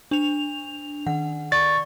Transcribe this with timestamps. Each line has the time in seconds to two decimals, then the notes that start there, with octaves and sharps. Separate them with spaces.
0.11 D4 F7
1.07 D#3 F#5
1.52 D5 C#6 A6